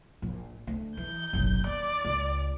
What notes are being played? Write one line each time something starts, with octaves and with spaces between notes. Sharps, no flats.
A#1 A#2
D2
E3 G6
F#1 B1
D#2 D5
C#2